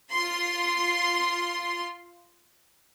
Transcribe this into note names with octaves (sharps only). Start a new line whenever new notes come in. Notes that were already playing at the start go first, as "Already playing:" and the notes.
F4 C6